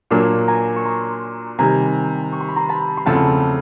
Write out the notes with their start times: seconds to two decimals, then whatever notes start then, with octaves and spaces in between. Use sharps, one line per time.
0.11 A#2 F#3 A#3 D4
0.48 G#5 A#5
0.76 C#6
0.85 A#5 C6
1.58 C3 D#3 G3 G#5 A#5
2.32 C#6
2.40 C6
2.48 B5
2.56 A#5 C6
2.69 A5 B5
2.97 C6
3.06 E2 C#3 F3 A3 C4 A5 B5